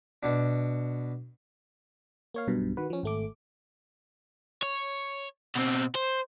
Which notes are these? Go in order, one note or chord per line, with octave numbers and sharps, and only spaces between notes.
B2 D4
A#3 C#5 F5
B1 G2 B2
D#3 F#4 B4
F3 C#4
G#1 A3 D6
C#5
B2 C4
C5